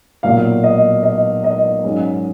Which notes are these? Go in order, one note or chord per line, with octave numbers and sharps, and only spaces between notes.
B1 A#2 F#3 B3 F5
D#5
D#5
D#5
G#2 F#3 C#4